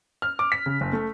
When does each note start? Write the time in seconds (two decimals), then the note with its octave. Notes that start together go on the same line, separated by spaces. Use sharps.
0.22 F6
0.39 D6
0.52 B6
0.66 C#3
0.81 F#1
0.93 A3